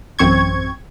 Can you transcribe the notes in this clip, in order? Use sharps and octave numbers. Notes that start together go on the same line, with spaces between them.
A1 F#2 C4 C#6 G#6